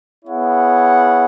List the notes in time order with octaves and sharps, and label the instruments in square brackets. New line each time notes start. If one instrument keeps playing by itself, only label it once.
[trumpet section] B3 E4 G#4 C#5 F#5